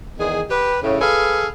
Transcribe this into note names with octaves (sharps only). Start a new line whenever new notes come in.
E2 D#3 G#4
G4 B4
A2 C#3
G#4 A4 B4 F5